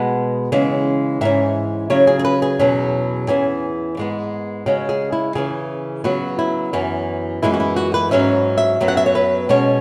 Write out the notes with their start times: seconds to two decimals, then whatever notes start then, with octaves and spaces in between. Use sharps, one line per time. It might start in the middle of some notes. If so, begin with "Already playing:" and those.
Already playing: B2 G#3 B3 F#5
0.52 C#3 E3 G#3 C#4
1.21 G#2 E3 C#4 E5
1.90 C#3 F#3 C#4 C#5
2.07 G#4
2.19 G#4
2.25 B4
2.42 G#4
2.59 E2 B2 F#3 C#4
3.28 E2 E3 C#4 G#4
3.97 G#2 G#3 B3
4.66 C#3 G#3 C#4 F#4
4.89 G#4
5.12 E4
5.35 C#3 E3 C#4 G#4
6.04 C#3 F#3 B3 F#4
6.39 E4
6.73 F#2 E3 B3 C#4
7.42 F#2 E3 G#3 B3 E4
7.54 F#4
7.60 E4
7.76 F#4
7.94 B4
8.11 G#2 F#3 C#4 E5
8.57 E5
8.80 F#2 F#3 B3
8.88 F#5
8.97 E5
9.06 C#5
9.15 B4
9.49 B2 G#3 C#4 C#5